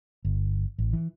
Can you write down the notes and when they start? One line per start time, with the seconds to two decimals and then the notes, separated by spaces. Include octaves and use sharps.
0.25 G1
0.78 A1
0.93 E3